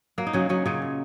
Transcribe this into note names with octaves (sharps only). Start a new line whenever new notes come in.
F#3 A#3
D#4
C#3 F#3 C#4
C#3 F#3 C#4
A#2 C#3 C#4
A#2